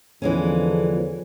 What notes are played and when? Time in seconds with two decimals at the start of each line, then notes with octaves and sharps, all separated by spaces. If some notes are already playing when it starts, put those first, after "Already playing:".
0.22 E2 D3 E3 F3 G#3 C#4